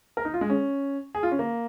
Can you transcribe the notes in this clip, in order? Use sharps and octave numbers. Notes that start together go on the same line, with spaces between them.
A#4
D#4
F4
G#3
C#4
G#4
F4
C#4
A#3